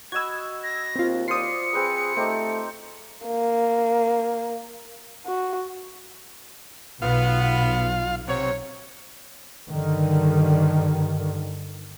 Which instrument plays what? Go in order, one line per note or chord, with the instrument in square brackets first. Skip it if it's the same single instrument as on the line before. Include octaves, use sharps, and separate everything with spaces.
[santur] F#4 D#5 B5 [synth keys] E6 G#6
[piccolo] A#6
[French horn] D#2 [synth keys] C4 F4
[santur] F4 C5 D5 [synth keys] D#6 C7 [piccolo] C#7
[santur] C4 B4 B5 [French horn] G#4
[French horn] A3 [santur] C4 D#4 G4
[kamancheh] A#3
F#4
[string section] B1 [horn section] B3 [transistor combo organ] F4 F5
[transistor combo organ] C3 [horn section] F#3 C#5
[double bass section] G2 D3 D#3